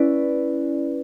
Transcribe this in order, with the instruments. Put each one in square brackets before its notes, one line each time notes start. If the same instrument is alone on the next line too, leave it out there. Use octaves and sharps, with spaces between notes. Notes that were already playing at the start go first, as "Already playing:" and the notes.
Already playing: [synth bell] C#4 E4 B4 D5